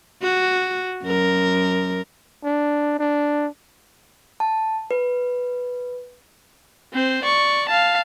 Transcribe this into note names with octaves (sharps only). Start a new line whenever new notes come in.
F#4
F#2 A#4
D4
D4
A5
B4
C4 C5
D5 C#6
F5 A5